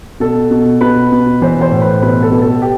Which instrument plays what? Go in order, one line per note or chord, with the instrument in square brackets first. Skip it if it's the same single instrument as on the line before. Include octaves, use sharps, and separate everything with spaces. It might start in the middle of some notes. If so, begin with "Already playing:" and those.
[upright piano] B2 A4
B2
B2 B4
B2
E3 C5
C5
A2
B4
B2 B4
A4
B2
A4
G4